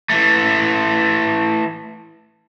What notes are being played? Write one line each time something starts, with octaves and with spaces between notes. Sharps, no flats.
E3 A3